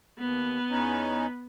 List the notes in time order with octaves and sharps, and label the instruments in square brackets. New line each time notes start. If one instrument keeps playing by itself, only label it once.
[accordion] D#2 [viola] B3
[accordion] E2 C#4 D#4